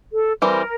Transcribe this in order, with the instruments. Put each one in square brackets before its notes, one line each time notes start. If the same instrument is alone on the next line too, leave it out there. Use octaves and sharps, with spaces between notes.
[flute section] A4
[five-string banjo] E3 G3 C4 [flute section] A#4